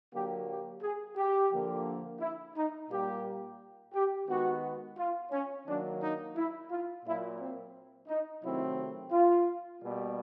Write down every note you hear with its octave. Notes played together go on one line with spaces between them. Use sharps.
D3 F#3 A#3 G4
G4
G#4
G4
D3 F3 A#3
E4
D#4
A#2 G3 A#3 G4
G4
D#3 G#3 B3 F#4
F4
C#4
D#3 F#3 A#3 D4
D#4
E4
F4
A#2 F#3 A#3 E4
C4
D#4
C3 D#3 F#3 A3 C4 E4
F4
B2 G3 A#3